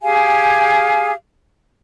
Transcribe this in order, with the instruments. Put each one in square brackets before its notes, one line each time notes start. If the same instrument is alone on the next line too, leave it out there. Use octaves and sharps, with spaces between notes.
[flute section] G4 G#4 F5 G#5